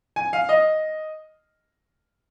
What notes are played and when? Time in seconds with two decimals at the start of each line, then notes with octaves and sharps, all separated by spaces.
0.16 G#5
0.33 F5
0.49 D#5